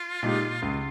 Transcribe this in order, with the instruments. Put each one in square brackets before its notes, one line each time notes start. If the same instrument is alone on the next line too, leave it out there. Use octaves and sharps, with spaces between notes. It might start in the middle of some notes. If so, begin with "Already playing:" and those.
Already playing: [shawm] F4
[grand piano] A#2 G#3 D#4 G4
[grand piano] C#2 [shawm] F4